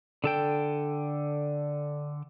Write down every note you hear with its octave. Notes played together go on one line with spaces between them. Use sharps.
D3 A4 G5